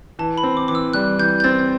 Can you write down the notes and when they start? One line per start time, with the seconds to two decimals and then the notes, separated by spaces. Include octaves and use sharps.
0.19 E3 A5
0.38 B5
0.43 C4
0.57 D6
0.68 E3 D6
0.75 E6
0.93 G3 F#6
1.19 E3 G6
1.40 G6
1.44 C4 A6